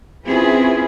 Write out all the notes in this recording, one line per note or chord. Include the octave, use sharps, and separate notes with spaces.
C4 C#4 E4 F4 G#4 B4